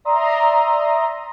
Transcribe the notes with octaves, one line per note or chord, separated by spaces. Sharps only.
D5 E5 A#5 C6 D#6